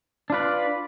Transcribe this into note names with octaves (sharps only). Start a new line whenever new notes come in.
D4 F4 B4 D5